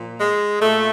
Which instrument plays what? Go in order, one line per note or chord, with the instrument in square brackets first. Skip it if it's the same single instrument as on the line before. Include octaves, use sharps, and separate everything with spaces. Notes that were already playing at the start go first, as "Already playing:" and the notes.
Already playing: [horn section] A#2 F3
G#3
A#2 A3